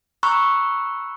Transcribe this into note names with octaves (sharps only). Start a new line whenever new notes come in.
A#5 B5 C#6 E6 F#6